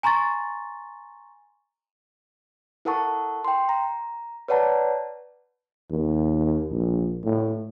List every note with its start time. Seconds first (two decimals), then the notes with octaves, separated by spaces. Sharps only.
0.03 G#5 A#5 C6 C#6 A6
2.85 E4 A4 A#4 F#5 A5 C#6
3.45 G5 C6
3.69 A#5
4.48 B4 C#5 D5 F#5 A5 A#5
5.90 D#2
6.71 A#1
7.25 A2